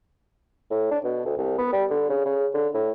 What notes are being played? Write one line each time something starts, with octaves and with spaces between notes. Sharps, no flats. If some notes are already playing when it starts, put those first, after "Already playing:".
A2
D4
B2
D2
C2
B3
G3
D3
C#3
C#3
D3
A2